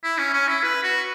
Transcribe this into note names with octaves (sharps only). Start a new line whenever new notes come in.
E4
C#4
C#4
E4
B4
F#4